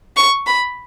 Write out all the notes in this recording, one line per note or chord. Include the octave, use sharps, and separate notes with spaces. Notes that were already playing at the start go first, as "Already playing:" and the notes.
C#6
B5